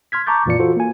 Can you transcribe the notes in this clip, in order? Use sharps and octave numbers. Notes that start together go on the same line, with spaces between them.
C6 F6 G#6 B6
A5 A#5 C#6 D6 G6 A6
F2 A#2 E3 F4 D5 C#7
F4 F#4 A4 C5
A#3 G#5